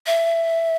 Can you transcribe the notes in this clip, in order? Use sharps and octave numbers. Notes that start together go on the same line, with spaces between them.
E5